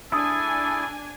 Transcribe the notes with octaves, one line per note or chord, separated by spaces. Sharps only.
D4 E4 G#4 A4 G#5 D#6